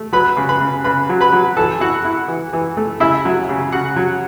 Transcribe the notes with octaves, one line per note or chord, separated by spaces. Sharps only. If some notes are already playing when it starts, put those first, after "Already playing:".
Already playing: A3
F#3 B4 B5
C#3
B4 B5
C#3
C#3 B4 B5
F#3
B4 B5
F#3
E3 A4 A5
E4 F#4 F#5
E4
E3
E3
A3
C#3 E4 E5
F#3
C#3
C#3 F#4 F#5
F#3